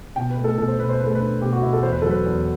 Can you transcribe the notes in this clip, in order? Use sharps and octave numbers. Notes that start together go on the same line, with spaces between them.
B2 G5
B4
A3
A4
B2 A4
C5
B2 B4
C5
A3 B4
A4
D4 B4
B2 G4
F#4
B2 E4
A4
E2 C5
B4
F#3 A4
B4
E2